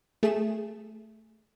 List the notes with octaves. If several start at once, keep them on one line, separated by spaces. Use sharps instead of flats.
A3 G#4 E7